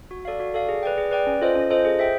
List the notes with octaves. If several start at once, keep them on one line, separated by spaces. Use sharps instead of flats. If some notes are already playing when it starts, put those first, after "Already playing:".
F#4
A4 D5 F5
F#4
A4 D5 F5
G#4
B4 D5 G5
G#4
B4 D5 G5
C#4
F4 A4 C5 D#5
C#4
F4 A4 C5 D#5
G#4
C5 E5 G5